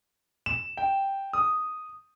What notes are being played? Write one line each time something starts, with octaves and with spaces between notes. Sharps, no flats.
E7
G5
D#6